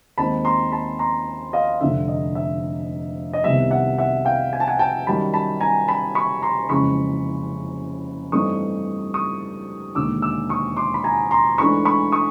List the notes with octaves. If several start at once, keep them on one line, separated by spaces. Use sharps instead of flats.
D#2 D#3 G#3 C4 D#4 A5 B5
A#5 C6
A5 B5
A#5 C6
D#5 F5
F1 F2 D3 E5
D#5
E5
D#5
C2 C3 D#3 G3 B3 E5
E5 F#5
E5 F#5
F5 G5
G#5
A5
F#5 G#5
G5 A5
F#2 D#3 G3 A5 B5
A5 B5
G#5 A#5
A5 B5
B5 C#6
A#5 C6
F#1 F2 C#3 E3 G#3 B5 C#6
G2 E3 A3 C4 D#4 C#6 D#6
C#6 D#6
E1 D#2 D3 D6 E6
D6 E6
C#6 D#6
C6 D6
B5
G#5 A#5
A#5 C6
G#2 E3 A3 D4 B5 C#6
B5 C#6
C#6 D#6